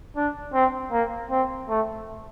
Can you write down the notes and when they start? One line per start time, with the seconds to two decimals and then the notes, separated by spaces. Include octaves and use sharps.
0.16 D4
0.54 C4
0.92 A#3
1.30 C4
1.69 A3